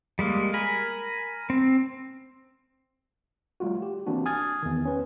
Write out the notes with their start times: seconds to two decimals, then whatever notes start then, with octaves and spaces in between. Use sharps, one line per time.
0.19 G3 G#3 A#3
0.54 A#4 G#5 B5
1.50 C4
3.60 G3 A3 F4 F#4
3.82 G4
4.06 E3 A#3 C4 D4 F#4
4.26 G#5 D#6 F6 G#6 A6
4.62 E2 D#3
4.85 C#4 B4